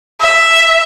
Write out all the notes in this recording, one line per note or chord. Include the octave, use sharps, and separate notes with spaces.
E5